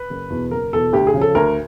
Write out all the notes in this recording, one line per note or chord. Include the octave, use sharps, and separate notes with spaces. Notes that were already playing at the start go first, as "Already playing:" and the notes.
Already playing: B4
F#1
E2 B2
F#1 A#4
E2 B2 A4
D2 G4
G#4
C#3 F3
A4
D2 A#4